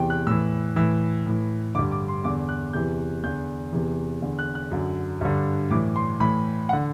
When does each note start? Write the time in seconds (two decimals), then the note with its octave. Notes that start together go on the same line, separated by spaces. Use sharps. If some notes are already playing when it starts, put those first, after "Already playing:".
Already playing: E2 C3 E3 G5
0.10 F#6
0.27 A2 E3 E6
0.76 A2 E3 E6
1.26 A2 E3
1.75 D3 D6
1.79 G2
1.91 D6
2.08 C6
2.24 E2 D3 D6
2.49 F#6
2.73 E2 C3 E3 G6
3.24 E2 D3 G6
3.73 E2 C3 E3
4.22 E2 D3
4.39 F#6
4.55 F#6
4.71 F#2 D3
5.21 G2 D3
5.70 A2 E3 D6
5.96 C6
6.20 A2 E3 B5
6.69 F#5
6.73 D3